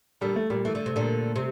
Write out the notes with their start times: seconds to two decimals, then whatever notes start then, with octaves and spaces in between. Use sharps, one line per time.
0.21 A#2 D3 G3
0.36 A3
0.50 A#2 G3
0.65 E3 A3
0.75 D3
0.86 C3
0.96 A#2 D3
1.36 C3